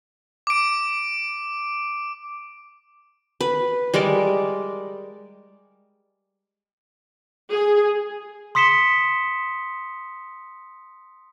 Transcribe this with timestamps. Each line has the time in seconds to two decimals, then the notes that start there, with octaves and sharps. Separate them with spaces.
0.47 D6 D7
3.41 B4
3.94 G3 G#3 A#4 D5
7.51 G#4
8.55 C6 D#6 B6 C#7 E7 G7